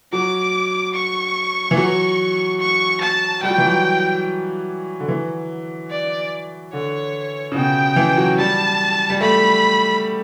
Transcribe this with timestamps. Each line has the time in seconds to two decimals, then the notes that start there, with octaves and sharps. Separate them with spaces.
0.13 F#3 D6
0.95 C#6
1.71 E3
1.77 F#3 C#6
2.60 C#6
3.01 A5
3.43 G3 G5
3.50 F#3
3.58 E3
3.66 F#3
5.00 D3
5.08 E3
5.91 D5
6.73 D3 C#5
7.52 C#3
7.55 B2 G5
7.96 E3
8.17 F#3
8.38 G3 A5
9.10 G3
9.21 A3 B5